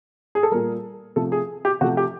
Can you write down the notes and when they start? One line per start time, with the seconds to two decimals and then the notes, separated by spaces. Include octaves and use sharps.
0.35 G#4
0.43 A4
0.52 A#2 G3 A#4
1.16 C3 F3 A3 A4
1.32 G#4
1.65 G4
1.81 C3 F3 A3 F#4
1.97 G4